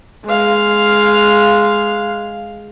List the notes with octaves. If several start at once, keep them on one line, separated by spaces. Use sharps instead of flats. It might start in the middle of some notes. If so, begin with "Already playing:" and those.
G#3 F5